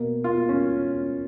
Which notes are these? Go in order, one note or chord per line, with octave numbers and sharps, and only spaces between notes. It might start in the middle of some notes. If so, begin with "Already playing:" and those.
Already playing: B2 A#3
B2 A#3 F4
C#4